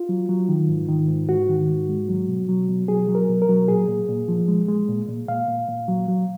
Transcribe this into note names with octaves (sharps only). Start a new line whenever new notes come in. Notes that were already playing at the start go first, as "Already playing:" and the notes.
Already playing: F4
F#3
F#3
D#3
G#2
D#3
G#2
G#2 F#4
D#3
G#2
G#3
F#3
B2
F#3
B2
F#3 G#4
F#3
A#4
B2
A#4
F#3
A#2 G#4
A#2
A#2
F3
G#3
G#3
A#2
A#2
A#2 F5
A#2
A#2
F#3
F#3